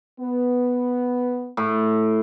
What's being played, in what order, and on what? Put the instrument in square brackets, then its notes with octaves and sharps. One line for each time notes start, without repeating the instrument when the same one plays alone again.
[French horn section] B3
[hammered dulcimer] A2